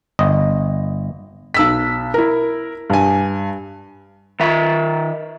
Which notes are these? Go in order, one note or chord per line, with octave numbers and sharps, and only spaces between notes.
G1 D#5
B1 E6 B6
E4 A#4
G2 G#5
D#3 E5